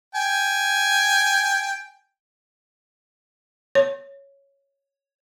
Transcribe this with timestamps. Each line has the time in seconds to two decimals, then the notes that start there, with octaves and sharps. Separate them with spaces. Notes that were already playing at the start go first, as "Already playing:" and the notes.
0.15 G5 G#5
3.75 C#5